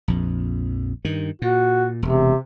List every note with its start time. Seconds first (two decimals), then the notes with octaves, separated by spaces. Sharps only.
0.08 A#1 F2
1.05 G2 D#3
1.42 A#2 F#4
2.02 E1 C3